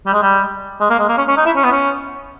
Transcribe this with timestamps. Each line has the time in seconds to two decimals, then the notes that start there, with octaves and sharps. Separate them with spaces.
0.06 G3
0.13 G#3
0.22 G3
0.80 G#3
0.90 A#3
0.99 G#3
1.09 A#3
1.18 C#4
1.28 C#4
1.37 D#4
1.46 E4
1.56 C#4
1.64 B3
1.71 C#4